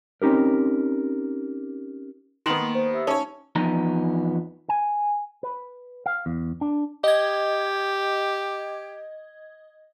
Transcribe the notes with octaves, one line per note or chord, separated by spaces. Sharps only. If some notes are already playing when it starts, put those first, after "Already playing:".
C4 C#4 D#4 G4 A#4
D#3 B3 C6 F#7
A#3
C5
G4 E5 E6
C#4 D#4 C#5 A5
E2 F3 B3 D#4 A#5
G#5
B4
F5
E2
D4
G4 D#5 G#6